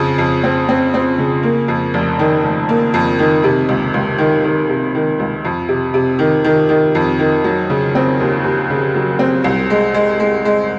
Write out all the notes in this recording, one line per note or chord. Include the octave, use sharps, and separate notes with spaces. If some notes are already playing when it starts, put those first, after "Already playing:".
Already playing: F2 C#3 F3
F2
C4
C4
C4
C#3
A#3
F2
F1
D#3
F1
A#3
F2
D#3
C3
C#2
C#2
D#3
D#3
C3
D#3
C#2
F2
C3
C3
D#3
D#3
D#3
F2
D#3
F#3
C#3
C4
D#2
D#2
C#3
F#3
C4
C2
G#3
G#3
G#3
G#3